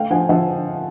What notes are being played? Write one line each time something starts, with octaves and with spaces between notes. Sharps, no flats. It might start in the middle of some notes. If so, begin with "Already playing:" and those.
Already playing: A3 F5 G5
F3 F#5 G#5
F3 E5 F#5